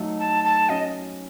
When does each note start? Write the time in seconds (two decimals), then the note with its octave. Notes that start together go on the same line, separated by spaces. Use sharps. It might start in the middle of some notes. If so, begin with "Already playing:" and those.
Already playing: F#3 A3 D#4
0.19 A5
0.44 A5
0.69 F#3 C#4 F#4 D#5